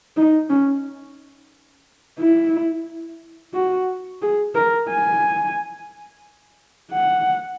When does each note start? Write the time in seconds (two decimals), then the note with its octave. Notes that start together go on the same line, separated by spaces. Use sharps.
0.16 D#4
0.50 C#4
2.19 E4
3.54 F#4
4.22 G#4
4.55 A#4
4.89 G#5
6.92 F#5